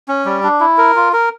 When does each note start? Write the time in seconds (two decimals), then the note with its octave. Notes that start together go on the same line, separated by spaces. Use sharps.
0.08 C#4
0.25 G3
0.43 D4
0.60 E4
0.78 A#4
0.96 F4
1.13 A#4